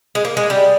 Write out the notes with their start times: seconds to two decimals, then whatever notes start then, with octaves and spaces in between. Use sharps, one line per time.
0.15 G#3
0.25 A#3
0.37 G#3
0.50 G3